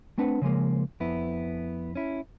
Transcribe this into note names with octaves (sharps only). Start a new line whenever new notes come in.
A3 C4 D4 B4 F#5
C#3 F3 G#3 A#3
F2 B3 E4
C#4 E4